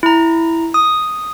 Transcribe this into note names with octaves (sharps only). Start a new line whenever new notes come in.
E4 A#5
D#6